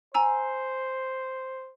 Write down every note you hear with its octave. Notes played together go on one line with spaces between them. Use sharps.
C5 G#5 A#5 E6